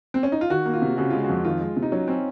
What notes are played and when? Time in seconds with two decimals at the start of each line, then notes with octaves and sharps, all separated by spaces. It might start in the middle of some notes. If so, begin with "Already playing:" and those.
0.14 C4
0.23 C#4
0.32 D#4
0.41 F4
0.50 D#3 F#4
0.66 A#3
0.73 F4
0.82 C3
0.97 C#3 F#4
1.10 G#3 F4
1.24 F#4
1.29 F2
1.45 D#3 F4
1.61 G#3
1.77 C3
1.83 D#4
1.92 F#3 C#4
2.08 C4 C#4